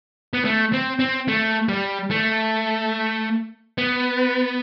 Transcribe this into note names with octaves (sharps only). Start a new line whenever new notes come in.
B3
A3
C4
C4
A3
G3
A3
B3